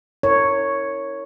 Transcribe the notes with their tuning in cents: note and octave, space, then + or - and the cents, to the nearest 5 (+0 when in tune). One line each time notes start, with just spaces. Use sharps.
E4 -40 A#4 -30 C#5 +0